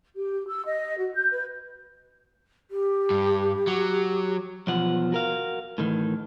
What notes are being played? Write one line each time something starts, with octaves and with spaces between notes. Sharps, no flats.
G4
E6
D#5
F#4
G6
B4
G4
G2
F#3
B1 E2 F3 F#5
F#4 A#4 F5
A2 D#3 E3